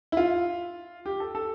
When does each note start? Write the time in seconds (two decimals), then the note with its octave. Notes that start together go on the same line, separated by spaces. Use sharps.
0.12 E4
0.17 F4
1.06 G4
1.20 A4
1.35 A4